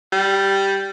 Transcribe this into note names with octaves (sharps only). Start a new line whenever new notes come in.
G3